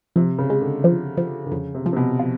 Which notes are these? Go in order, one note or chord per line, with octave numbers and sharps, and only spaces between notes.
C3 F3
C#3
G#3
D3
F3
F3
D3
F2 C#3
C3
F3
C3
B2
F3